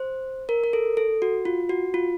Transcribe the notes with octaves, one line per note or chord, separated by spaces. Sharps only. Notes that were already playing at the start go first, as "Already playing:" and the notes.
Already playing: C5
A#4
A#4
A4
A4
F#4
F4
F#4
F4